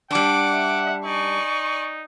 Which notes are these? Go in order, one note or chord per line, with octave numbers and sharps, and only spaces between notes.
G3 D4 F#5 D6
E5
D#4 D5 G#5 C#6